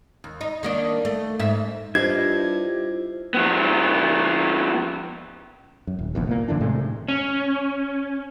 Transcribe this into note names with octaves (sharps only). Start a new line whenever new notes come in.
D#2
D#4
D#3 A#3 D4
A3
G#2 E5
G2 E4 F4 G4 C5 D#5 G#6
F3 B3
F#2
D#1
F1 A#1 E2
A#2 A#3
F#2 D3 E3 D4
A2 C3 G#3 A3
C#4